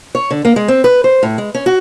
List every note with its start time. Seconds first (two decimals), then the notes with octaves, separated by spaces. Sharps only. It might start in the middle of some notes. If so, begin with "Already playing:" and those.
0.15 C#5
0.31 D3
0.45 A#3
0.56 G#3
0.68 C4
0.84 B4
1.04 C5
1.23 A2
1.38 G#3
1.55 C#4
1.66 F#4